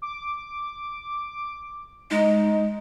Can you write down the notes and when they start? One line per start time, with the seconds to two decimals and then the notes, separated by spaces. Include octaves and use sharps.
0.02 D6
2.11 G#3 D#4